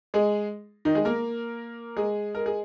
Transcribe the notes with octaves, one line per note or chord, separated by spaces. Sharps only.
G#3 G#4
D#3 D#4
G#3 G#4
A#3 A#4
G#3 G#4
A#4
G#4